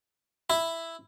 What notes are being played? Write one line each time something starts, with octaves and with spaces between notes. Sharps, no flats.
E4